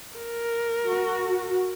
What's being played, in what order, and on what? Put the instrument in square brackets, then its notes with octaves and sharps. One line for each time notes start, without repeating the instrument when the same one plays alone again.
[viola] A#4
[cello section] F#4